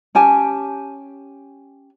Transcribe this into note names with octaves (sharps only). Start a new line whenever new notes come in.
C#4 G4 G#5 A5